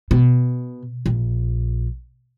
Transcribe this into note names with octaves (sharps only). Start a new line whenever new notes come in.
B2
A#1